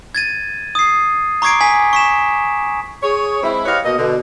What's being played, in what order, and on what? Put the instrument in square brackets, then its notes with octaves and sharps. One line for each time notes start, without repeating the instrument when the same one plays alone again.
[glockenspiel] G#6 A6 D#7
D#6 C7
A#5 C#6 D6 G#6 C7 D7
G#5 B6
C#6 B6 E7
[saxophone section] G#4 C#5
G#3 C4 E4
G4 B4 C#5 D#5 F5
B2 A#3 D#5
B2 D3